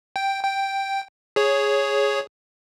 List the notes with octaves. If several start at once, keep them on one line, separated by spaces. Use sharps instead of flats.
G5
G5
G#4 C#5